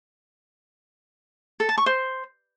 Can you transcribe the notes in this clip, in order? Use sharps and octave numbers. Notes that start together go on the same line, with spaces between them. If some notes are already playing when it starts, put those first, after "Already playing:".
A4
A5
C#6
C5